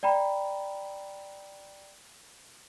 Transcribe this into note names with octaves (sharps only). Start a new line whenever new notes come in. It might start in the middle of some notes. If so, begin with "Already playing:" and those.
D5 G5 A#5 B5